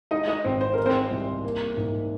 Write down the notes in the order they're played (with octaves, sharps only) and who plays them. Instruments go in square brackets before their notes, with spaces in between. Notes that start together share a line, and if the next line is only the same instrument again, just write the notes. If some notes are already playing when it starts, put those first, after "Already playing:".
[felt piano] G#3 [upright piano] D#4 D#5
[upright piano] D#4 D#5
[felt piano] G#1 [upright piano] C4 C5
[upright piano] C5
[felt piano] G#3 [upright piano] A#4
[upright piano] C4 C5
[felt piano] C2
A#3
G#2